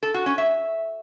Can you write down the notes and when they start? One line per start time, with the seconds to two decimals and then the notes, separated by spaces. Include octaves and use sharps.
0.03 A4
0.14 F#4
0.26 C#4
0.38 E5